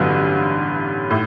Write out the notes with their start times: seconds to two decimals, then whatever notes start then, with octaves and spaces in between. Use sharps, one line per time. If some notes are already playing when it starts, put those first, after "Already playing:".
Already playing: A1 G2 D3 F#3 B3
1.10 A2